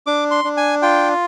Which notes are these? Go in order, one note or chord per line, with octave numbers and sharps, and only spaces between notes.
D4 D6
C6
D4
G#5
F4 G5